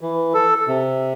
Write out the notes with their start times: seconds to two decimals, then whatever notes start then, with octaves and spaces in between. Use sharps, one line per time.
0.01 E3
0.34 A4
0.67 C3